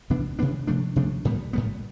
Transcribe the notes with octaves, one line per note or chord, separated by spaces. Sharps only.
C3 E3 B3 D4
C3 E3 B3 D4
C3 F3 A3 D4
C3 F3 A3 D4
A2 G3 B3
A2 G3 B3